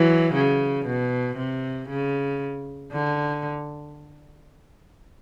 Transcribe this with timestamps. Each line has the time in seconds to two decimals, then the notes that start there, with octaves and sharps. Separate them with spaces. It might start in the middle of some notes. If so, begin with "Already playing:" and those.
Already playing: E3 F#3
0.34 C#3
0.86 B2
1.37 C3
1.89 C#3
2.92 D3